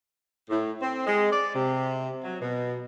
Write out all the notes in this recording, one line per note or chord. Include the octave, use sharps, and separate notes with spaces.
A2
C4
G#3
D5
C3
F#3
B2